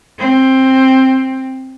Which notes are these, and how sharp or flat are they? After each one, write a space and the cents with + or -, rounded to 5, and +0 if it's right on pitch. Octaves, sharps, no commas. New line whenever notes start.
C4 +10